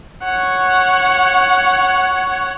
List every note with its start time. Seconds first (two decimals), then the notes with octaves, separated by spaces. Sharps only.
0.24 C#5 F#5